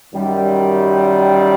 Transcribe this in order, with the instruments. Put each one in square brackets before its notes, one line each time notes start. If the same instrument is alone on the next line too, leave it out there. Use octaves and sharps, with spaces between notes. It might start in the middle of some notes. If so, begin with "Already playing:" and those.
[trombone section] F#2 D#3 G3